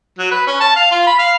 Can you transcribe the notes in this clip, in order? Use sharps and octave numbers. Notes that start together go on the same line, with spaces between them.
F#3
B4
C#4
A5
F5
F4
B5
F5